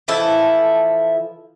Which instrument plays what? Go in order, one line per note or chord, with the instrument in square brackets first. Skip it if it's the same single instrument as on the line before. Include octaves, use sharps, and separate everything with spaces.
[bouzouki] E3 F3 E4 A4